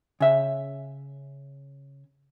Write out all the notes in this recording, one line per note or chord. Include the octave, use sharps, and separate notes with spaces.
C#3 E5